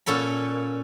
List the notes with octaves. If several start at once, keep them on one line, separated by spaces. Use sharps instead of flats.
A#2 C#4 A4 B5